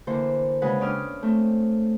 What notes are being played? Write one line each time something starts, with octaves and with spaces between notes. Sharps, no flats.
D3 E3 A#3 D4 C5
C#3 G#3 F#4 B4 F#5
C#4 D4 D5 G5 D#6 F6
A3 C4